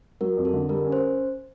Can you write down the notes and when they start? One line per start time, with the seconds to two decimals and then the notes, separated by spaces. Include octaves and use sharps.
0.21 F#3 A#4
0.37 F2
0.45 A4
0.53 D3
0.69 G3 A#4
0.84 C#4
0.92 C5